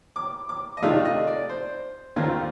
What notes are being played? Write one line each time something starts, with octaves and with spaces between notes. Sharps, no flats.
D6
D6
D#5
C3 D#3 A3 D4 F4 F5
D#5
D5
C5
D#2 D3 A3 C4 F4 A#4
F4